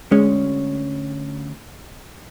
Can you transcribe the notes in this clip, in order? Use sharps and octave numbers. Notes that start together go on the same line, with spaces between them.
D2 G#3 C#4